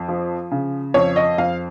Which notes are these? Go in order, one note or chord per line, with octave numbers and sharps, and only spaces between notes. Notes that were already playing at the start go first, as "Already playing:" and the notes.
Already playing: F2
F3
C#3
F2 C#5
D#5
F2 F5